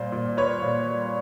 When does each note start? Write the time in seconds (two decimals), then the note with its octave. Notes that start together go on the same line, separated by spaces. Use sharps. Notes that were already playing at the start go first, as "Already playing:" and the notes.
Already playing: A#2 G3 C5
0.12 A#2
0.37 G3 B4 C#5
0.62 A#2
0.88 G3